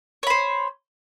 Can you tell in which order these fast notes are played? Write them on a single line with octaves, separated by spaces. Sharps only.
C#5 B5 C5